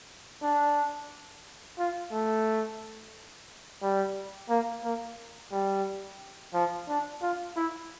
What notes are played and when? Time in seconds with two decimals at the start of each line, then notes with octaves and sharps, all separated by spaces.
0.42 D4
1.79 F4
2.12 A3
3.82 G3
4.50 A#3
4.84 A#3
5.52 G3
6.54 F3
6.88 D4
7.22 F4
7.57 E4